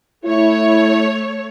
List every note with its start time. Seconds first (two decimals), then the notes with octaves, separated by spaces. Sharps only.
0.24 A3 E4 C#5